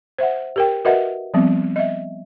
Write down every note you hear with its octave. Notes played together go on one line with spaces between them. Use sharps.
C5 E5 F#5
G4 A#4 G5
F#4 A#4 B4 D#5 E5 F#5
F3 G3 B3 C4
D#5 E5